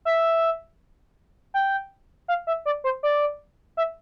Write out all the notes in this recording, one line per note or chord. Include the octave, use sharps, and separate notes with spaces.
E5
G5
F5
E5
D5
C5
D5
E5